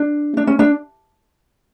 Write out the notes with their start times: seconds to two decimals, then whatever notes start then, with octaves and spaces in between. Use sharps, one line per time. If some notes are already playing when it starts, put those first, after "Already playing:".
Already playing: D4
0.37 D4
0.47 C#4
0.59 D4